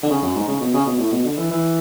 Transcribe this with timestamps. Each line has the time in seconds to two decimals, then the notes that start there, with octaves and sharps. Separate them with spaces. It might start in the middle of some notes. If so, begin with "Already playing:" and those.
0.03 D3
0.10 C#3
0.22 F#2
0.35 G#2
0.48 C#3
0.61 B2
0.74 C#3
0.86 B2
0.99 A2
1.12 B2
1.25 D3
1.37 E3
1.51 E3